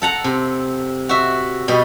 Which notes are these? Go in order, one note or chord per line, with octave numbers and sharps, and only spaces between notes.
A4 F#5 A#5
C3
F#4 E5
B2 G3 D#5